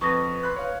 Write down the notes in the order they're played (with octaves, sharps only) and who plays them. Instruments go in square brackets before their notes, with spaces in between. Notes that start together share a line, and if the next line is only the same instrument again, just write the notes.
[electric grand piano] F2 [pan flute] B4 [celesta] C#6 D#6 A#6
[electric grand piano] B5 C6 F#6
C#5 F5